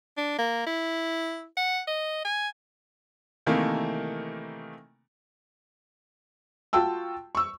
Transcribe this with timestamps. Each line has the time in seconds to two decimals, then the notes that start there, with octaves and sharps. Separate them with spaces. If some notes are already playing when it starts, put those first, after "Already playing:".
0.17 D4
0.38 A#3
0.67 E4
1.57 F#5
1.88 D#5
2.25 G#5
3.46 C3 D#3 E3 A3 A#3
6.73 F4 F#4 G5 A5 E6
7.35 C#6 E6